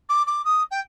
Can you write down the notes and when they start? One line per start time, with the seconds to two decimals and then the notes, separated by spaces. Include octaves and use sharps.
0.09 D6
0.27 D6
0.45 D#6
0.71 G5